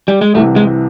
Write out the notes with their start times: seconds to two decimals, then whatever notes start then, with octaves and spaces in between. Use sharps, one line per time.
0.08 G3
0.21 G#3
0.35 C2 C3 E3 A3
0.56 G#3